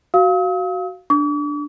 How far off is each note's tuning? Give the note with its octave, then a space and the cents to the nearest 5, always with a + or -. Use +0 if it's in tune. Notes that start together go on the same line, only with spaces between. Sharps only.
F#4 +10 F5 +0 D#6 +45
D4 +0 D6 -45